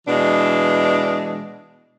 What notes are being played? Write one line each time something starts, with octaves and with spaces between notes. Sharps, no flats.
B2 E3 G#3 D4